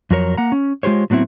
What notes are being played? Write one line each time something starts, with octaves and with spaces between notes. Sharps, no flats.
F2 F#3 A#4 C#5
A#3 F#5 A#5
C#4
G#3 F4 G4 C5 C#5
A2 F#3 B3 C4 E4